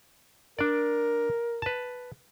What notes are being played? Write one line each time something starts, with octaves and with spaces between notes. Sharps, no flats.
D4 A#4 D5
B4 A5